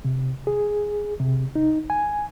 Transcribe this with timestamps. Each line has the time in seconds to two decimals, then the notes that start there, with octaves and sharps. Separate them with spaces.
0.05 C3
0.47 G#4
1.20 C3
1.55 D#4
1.90 G#5